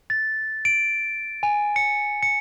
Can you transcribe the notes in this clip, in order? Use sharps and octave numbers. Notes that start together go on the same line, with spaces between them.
A6
D7
G#5
C#7
C#7